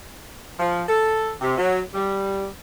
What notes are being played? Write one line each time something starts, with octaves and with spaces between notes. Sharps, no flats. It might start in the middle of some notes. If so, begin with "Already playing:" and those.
F3
A4
C3
F#3
G3